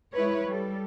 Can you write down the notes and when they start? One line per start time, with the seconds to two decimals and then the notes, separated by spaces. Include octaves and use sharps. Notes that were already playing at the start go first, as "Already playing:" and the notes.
0.14 G#3 E4 B4 C#5
0.45 G3 A4